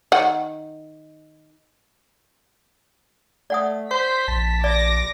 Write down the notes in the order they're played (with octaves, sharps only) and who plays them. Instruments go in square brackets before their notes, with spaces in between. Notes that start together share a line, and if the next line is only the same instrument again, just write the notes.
[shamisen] D#3 F#5
[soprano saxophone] A3 [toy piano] D5 F#5 D#6
[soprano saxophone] C5 [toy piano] C#6 [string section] B6
[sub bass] A#1 [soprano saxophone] A5
[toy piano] D5 [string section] D6 A#6